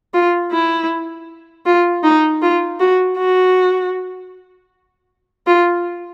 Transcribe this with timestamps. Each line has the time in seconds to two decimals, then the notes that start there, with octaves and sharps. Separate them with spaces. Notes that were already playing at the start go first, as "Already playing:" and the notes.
0.14 F4
0.51 E4
1.66 F4
2.03 D#4
2.42 F4
2.80 F#4
3.17 F#4
5.47 F4